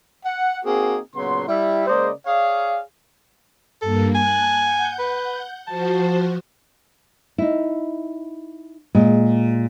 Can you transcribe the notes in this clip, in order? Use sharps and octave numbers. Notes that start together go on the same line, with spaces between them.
F#5
A#3 C4 D#4 F#4 G#4
A#2 C#3 F#3 B3 C6
G3 E4 E5
C#3 G#3 A#3 C5 D5 D#5
G#4 C#5 D5 F5
G2 A#3 A4
G#5 A5 F#6
F#5 G6
B4
F3 F#4 C5 A5
D#4 E4
A#2 G#3